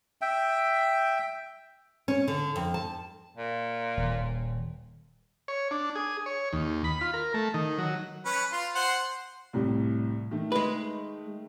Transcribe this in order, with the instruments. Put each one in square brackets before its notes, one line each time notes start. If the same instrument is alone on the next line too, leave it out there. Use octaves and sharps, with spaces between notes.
[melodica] E5 G5
[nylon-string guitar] C#4
D3
F2
A5
[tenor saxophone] A#2
[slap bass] D#1
[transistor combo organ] C#5
D4
G#4
C#5
D#2
B5
F4
A#4
A3
D#3
F#3
[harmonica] C#4 B4
F4 C6
C5 F#5 C6
[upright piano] C2 A2 G3
D#3 A3
[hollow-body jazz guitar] G#3 B4